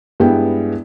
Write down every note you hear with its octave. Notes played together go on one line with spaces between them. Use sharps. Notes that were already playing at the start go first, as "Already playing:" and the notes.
G2 G#3 B3 E4 G5